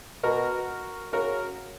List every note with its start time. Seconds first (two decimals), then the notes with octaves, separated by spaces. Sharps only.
0.23 B2 F#4 A#4
1.13 C#3 F#4 A#4